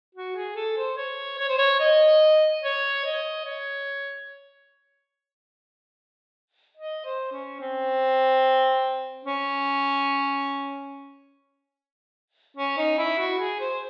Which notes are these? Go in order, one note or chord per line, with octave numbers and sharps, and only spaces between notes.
F#4
G#4
A4
C5
C#5
C#5
C5
C#5
D#5
C#5
D#5
C#5
D#5
C5
C#4
C4
C#4
C#4
D#4
E4
F#4
G#4
C5